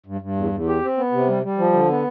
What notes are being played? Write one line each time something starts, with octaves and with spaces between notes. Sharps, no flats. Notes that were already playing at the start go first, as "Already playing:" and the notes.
G2
G2
E2
E2
G4
C4
B3
C3
G3
G3
F3
D3
B3